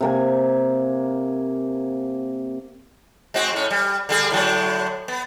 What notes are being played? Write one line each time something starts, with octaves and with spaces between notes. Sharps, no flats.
C3 A#3 G#5
G#3 C4 F#4
A2 C#4
G3
D3 G3 G#4
A2 D3 F#3
B3